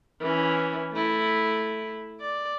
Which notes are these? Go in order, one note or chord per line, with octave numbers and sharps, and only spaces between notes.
E3 C#4
A3 E4
D5